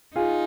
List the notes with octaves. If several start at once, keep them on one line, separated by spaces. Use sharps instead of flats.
D#4 F4 G#4